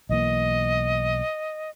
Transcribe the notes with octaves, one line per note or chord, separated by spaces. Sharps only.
B1 E3 A#3 D#5